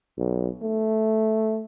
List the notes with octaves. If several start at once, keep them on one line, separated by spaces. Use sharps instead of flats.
B1
A3